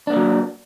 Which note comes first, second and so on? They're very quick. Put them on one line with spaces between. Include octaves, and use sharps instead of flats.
D4 B3 A#3 F#3